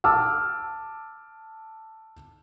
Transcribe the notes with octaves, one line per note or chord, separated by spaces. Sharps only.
A5 D6 E6 F6